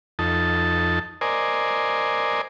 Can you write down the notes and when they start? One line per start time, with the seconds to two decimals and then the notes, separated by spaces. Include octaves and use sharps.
0.19 F2 D#4 A4 A5
1.21 A#4 C5 D5 D#5 G#5